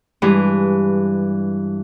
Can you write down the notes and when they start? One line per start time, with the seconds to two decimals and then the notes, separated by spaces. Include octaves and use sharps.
0.22 G2 E3 G#3